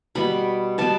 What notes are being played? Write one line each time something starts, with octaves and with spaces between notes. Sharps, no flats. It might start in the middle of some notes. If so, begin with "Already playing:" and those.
B2 G3 B3 B5
B2 G3 B3 A5